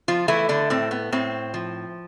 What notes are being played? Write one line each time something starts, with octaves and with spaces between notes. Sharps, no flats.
F3 F4
E3 A3 E4
D3 D4
A2 C4
B3
A2 C4
F3